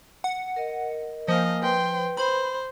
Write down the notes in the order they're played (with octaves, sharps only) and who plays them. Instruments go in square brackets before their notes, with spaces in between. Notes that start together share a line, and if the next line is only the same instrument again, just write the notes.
[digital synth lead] F#5
[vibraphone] A#4 D#5
[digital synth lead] F3 [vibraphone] A#3 A#4 G#5 [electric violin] D#5 F5
[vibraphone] B4 [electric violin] G5 C6
[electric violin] C5 [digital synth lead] B5